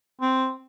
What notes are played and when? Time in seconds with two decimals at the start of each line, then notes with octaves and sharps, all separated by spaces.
0.21 C4